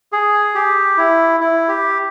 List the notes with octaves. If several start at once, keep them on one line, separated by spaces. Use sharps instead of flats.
G#4
G4
E4
E4
G4